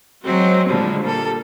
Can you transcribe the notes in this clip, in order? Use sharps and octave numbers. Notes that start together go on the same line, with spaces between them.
F#3 G#3 C4 F#4
A#2 D3 F3 G3 G#3
G3 A#3 A4